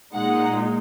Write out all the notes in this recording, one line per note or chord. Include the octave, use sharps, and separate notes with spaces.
A#2 G#3 D#4 F#5